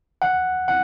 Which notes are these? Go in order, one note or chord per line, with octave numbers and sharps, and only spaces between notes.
F#5
F#5